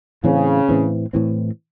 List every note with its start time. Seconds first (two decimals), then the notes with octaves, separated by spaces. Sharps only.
0.24 A2 C#3 E3 C4
0.69 A2 E3 C4
1.13 A2 E3 C4